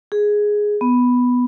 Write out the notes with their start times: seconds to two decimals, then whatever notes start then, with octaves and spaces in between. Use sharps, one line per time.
0.12 G#4
0.81 B3